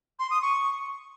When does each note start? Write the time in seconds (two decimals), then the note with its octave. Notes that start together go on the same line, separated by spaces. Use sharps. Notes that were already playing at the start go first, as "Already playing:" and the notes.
0.19 C6
0.31 D#6
0.42 C#6